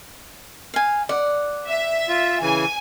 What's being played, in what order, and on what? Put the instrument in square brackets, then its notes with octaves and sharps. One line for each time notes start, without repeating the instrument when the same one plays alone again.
[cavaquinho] F5 G#5
[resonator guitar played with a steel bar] D5 [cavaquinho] F#5
[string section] E5
[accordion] F4
[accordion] C#3 E3 [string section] G#5